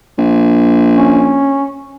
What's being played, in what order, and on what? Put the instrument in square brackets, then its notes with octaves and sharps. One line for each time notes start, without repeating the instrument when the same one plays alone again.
[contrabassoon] A#1
[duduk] C#4